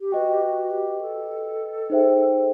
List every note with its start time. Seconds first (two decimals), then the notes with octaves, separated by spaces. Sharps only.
0.01 G4
0.12 F#4 B4 D#5 G5
0.34 G4
0.42 F#4
0.71 G4
1.01 A4
1.90 D#4 G#4 C5 E5 G5